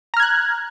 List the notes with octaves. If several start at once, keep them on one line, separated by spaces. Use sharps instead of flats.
A#5 F6 F#6 G#6